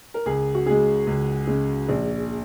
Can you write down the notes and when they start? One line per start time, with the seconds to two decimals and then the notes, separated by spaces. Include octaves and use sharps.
0.14 A#4
0.26 C#2 G#4
0.55 F#4
0.66 C#3 G#3 G#4
1.07 C#2
1.47 C#3 G#3
1.89 A#1